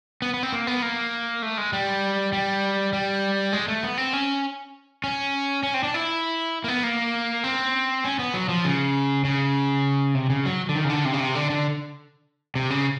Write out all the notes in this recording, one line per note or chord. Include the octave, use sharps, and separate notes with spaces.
B3
B3
C4
A#3
B3
A#3
A3
G#3
G3
G3
G3
G#3
A3
B3
C4
C#4
C#4
C#4
C4
D4
E4
A#3
B3
A#3
C4
C#4
B3
F#3
F3
C#3
C#3
C3
C#3
F#3
D3
D#3
C#3
D3
C3
C#3
C3
D3
D3
C3
C#3